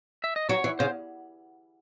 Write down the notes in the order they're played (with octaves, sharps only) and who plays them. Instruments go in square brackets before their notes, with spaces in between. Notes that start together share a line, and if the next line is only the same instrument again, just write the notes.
[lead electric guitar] E5
D#5
[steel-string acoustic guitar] F#3 [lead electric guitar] C#5
[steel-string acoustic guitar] E3
[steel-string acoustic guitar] C#3 [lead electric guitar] C5